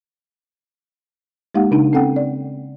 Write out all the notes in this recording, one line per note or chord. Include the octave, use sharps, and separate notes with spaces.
G#3 A#3 D#4 G4 F5 F#5
C#3 D4 D#4
C4 C#4 A4 F#5 G5
D5